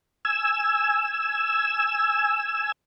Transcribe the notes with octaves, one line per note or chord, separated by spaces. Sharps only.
G#5 E6